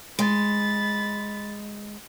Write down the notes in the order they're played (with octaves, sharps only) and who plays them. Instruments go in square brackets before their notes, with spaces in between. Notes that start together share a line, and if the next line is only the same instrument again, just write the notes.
[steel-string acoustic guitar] G#3 [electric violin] B5 A6